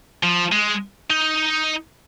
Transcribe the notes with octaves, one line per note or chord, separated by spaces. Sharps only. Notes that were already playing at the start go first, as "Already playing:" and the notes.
F3
G#3
D#4